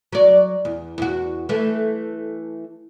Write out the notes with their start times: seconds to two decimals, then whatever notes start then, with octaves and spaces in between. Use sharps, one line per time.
0.13 F#3 D5
0.65 E2
0.98 E2 F#4
1.49 E3 A3